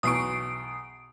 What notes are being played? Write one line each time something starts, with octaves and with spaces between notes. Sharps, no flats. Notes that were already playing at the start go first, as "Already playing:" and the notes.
B1 E2 C#6 D#6 C7 D7